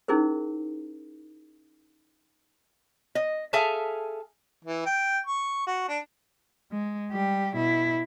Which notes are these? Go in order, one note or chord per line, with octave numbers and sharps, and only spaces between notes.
C#4 D#4 E4 G#4 A#4 C5
D#5
G#4 A4 E5 F5 G#5 A5
E3
G5
C#6
F#4
D4
G#3
G3 G4
B2 E4